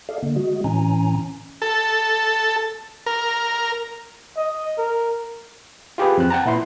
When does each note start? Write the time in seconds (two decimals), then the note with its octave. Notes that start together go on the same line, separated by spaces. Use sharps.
0.09 A4 D5 D#5 F5
0.23 D3 A#3
0.36 G#3 F#4 D#5
0.64 A2 E3 C#4 G#5 A#5
1.62 A4
3.06 A#4
4.37 D#5
4.78 A#4
5.98 F4 G4 G#4 B4
6.18 F2 C4 F#6
6.30 F#5 G5 A5 A#5
6.46 A#2 E4 B4 C6